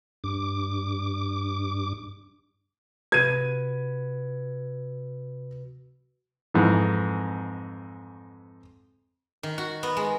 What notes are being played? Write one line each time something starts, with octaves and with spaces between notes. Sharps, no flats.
G2 D6
C3 F#4 B4 G#6 D#7
F2 G#2 E3
D#3
F#4
B3
G#3